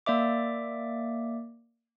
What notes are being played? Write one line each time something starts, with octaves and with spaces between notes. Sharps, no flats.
A#3 D5 E5 D6